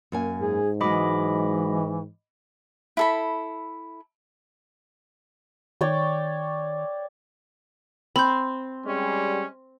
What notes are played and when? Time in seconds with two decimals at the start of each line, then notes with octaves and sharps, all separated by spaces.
0.12 F#2 A#3 G#5
0.40 G#2 G#4
0.81 E3 F#3 G#3 D#5 B5 D6
2.97 E4 A4 B5
5.81 D#3 C#5 D5 G5
8.16 C4 B5 G6
8.86 G3 G#3 C#4